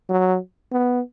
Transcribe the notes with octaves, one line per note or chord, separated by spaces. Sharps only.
F#3
B3